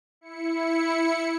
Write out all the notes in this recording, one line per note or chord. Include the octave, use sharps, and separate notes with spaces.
E4 C#7